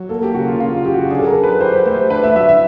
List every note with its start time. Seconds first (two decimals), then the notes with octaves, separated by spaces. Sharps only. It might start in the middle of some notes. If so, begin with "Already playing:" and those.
Already playing: F#3
0.09 A#3 A4
0.23 G4
0.35 C#3 F#4
0.48 F4
0.60 C#3 F4
0.77 F4
0.85 F#3 G4
0.94 F#4
1.11 D4 G#4
1.20 A4
1.27 A#4
1.35 F#3
1.43 B4
1.60 G4 C5
1.74 B4
1.86 A3 C5
2.10 D4 B4
2.24 E5
2.35 F#3 E5
2.49 E5